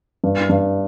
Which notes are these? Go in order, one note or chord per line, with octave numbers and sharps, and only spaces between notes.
G2
G2